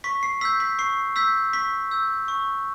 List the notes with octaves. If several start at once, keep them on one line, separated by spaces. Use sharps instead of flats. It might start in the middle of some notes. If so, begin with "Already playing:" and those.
C#6 B6
C7
E6 G6 B6
B6
C#6 C7
E6 G6 B6
C#6 B6
E6 G6
C#6